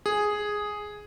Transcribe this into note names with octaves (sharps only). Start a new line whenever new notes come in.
G#4